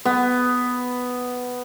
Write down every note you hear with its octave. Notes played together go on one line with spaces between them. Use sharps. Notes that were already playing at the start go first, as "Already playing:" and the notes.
B3